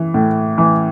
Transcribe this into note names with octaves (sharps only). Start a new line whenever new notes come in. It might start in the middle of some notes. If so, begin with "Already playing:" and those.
Already playing: E3
A2
E3